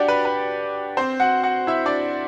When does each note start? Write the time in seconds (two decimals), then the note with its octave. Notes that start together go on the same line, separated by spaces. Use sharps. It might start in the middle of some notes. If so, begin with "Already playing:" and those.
Already playing: D4 F#4 G4 D5 F#5 G5
0.08 B4
0.25 B4
0.97 C4 C5
1.20 F#4 F#5
1.43 F#4 F#5
1.67 E4 E5
1.86 D4 D5